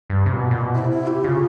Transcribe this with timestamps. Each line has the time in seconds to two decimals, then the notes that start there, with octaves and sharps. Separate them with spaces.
0.10 G2
0.26 C3
0.33 A#2
0.38 B2
0.51 A#2
0.63 B2
0.75 C3 E4
0.91 E4
1.07 G4
1.24 C#3 F4